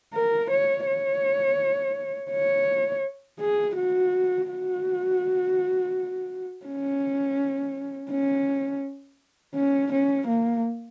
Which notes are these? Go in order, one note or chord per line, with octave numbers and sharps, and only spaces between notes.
A#4
C#5
C#5
C#5
G#4
F#4
F#4
C#4
C#4
C#4
C#4
A#3